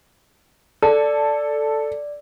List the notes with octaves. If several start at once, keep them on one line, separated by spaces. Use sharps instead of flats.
A4 D5